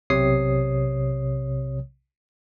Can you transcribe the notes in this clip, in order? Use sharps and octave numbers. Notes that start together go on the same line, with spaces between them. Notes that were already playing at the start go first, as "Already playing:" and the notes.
B1 C3 C#5 D#6 C7